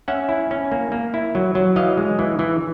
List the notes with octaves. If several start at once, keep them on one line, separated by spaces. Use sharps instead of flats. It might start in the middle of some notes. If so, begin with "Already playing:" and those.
C#4 E5 F#5
E4
C#4
A#3
A#3
E4
F#3
F#3
E3 D#5 F5
G#3
E3
E3